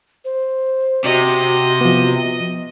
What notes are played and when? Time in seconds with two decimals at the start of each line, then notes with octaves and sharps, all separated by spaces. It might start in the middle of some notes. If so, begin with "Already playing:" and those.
0.25 C5
1.05 C3 F#4 D#5
1.81 F3 B3